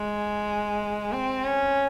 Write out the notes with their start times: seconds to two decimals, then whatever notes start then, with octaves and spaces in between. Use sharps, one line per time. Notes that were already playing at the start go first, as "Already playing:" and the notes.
Already playing: G#3
1.12 C4
1.45 C#4